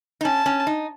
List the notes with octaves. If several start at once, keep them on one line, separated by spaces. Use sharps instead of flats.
D#4
C#4 A5
C#4
D#4